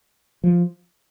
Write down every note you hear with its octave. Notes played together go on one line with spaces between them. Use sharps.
F3